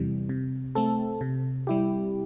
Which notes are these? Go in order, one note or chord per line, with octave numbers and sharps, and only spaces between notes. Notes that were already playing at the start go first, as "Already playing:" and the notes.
Already playing: E2 C3 E3 G3
C3
A3 C4 A4
C3
G3 E4 G4